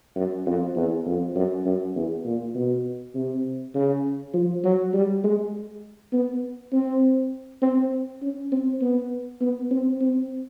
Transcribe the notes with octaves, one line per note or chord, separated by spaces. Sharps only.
F#2
F2
E2
F2
F#2
F#2
E2
A#2
B2
C3
C#3
F3
F#3
G3
G#3
B3
C4
C4
C#4
C4
B3
B3
C4
C4